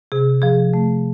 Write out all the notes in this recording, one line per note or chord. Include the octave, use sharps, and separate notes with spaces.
C3 G#4
F3 G#4
A3